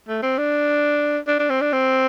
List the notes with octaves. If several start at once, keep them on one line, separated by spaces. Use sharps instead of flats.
A3
C4
D4
D4
D4
C4
D4
C4